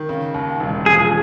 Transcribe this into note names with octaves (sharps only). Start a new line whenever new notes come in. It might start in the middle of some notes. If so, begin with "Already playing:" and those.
Already playing: D#3
C#3
D#2
E1
F3 G#4